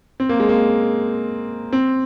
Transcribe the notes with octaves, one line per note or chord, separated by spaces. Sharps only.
C4
A#3
G#3
A#3
C4